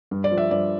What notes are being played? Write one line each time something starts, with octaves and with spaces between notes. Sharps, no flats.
G2
D5
F3
E5
G2 D5